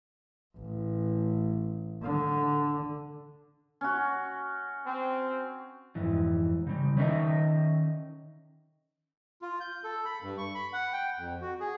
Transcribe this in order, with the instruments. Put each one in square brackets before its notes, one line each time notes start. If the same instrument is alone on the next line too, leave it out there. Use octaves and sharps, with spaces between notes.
[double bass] A1
D3
[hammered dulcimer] C#4 F#4
[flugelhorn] C4
[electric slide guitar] F2 G#2 E3
C#3 G3
D#3 C#4 D#4 A#4 D#5 E5
[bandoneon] F4
G6
A4
B5
G2
C#6
B5
F#5
G5
F2
F#4
G#4